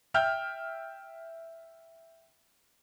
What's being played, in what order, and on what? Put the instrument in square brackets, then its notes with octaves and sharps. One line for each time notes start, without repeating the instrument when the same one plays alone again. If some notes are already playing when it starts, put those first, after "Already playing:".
[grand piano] E5 G5 F6 G6